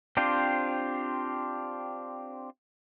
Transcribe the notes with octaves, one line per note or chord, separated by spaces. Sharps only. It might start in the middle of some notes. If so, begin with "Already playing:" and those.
C4 D4 F4 G4 C5